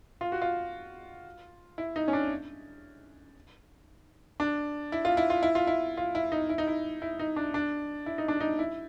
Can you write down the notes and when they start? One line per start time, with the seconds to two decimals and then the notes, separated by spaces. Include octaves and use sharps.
0.21 F4
0.32 F#4
0.42 F4
1.78 E4
1.96 D#4
2.08 C#4
2.13 D4
4.40 D4
4.92 E4
5.05 F4
5.17 E4
5.30 F4
5.43 E4
5.55 F4
5.67 E4
5.97 F4
6.15 E4
6.32 D#4
6.49 E4
6.58 D#4
6.67 E4
7.02 E4
7.19 D#4
7.36 D4
7.54 D4
8.06 E4
8.18 D#4
8.28 D4
8.40 D#4
8.59 E4